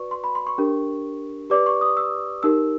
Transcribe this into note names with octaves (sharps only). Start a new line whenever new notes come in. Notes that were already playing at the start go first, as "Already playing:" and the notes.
Already playing: F#4 B4 D5 C#6
C6
B5
C6
C#6
D4 G4 A#4
G4 B4 D5 D6
C#6
D#6
E6
D#4 G4 A#4 E6